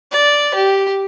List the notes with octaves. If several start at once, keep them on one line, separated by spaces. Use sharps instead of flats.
D5
G4